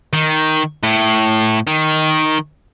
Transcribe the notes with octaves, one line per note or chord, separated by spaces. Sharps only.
D#3
A2
D#3